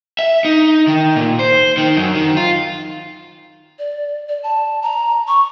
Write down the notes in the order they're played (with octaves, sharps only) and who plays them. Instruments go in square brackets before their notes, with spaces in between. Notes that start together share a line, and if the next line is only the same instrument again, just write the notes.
[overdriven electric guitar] E5
D#4
D#3
A#2
C5
D#3
F#2
D#3
F4
[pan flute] D5
D5
A5
A#5
C#6